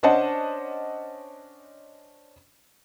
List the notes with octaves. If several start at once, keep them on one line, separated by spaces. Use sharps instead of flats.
C#4 D4 C5 D#5 F#5 A5